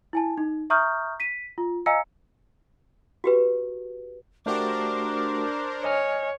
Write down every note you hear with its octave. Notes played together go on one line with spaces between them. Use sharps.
E4 G#5 A5
D#4
E5 A#5 C#6 D#6 F6 G6
B6 D#7
F4
D#5 F5 G#5 A#5 E6 C#7
F#4 G4 B4
A3 D4 F#4 G4 A#4 C5 D6
C#5 D#5 G#5 F6